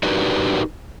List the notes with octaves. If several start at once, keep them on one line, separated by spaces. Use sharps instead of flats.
D4 D#4 F#4 G4 A#4 B4